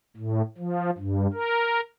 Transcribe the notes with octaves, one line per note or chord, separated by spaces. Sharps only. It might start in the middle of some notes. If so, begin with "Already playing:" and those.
A2
F3
G2
A#4